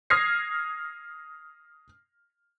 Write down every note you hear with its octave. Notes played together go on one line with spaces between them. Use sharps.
D#6 F6 G#6 A#6 C7